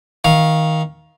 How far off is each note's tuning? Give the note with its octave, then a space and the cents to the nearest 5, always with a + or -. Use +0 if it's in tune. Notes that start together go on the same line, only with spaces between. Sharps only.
D#3 +20 F5 +0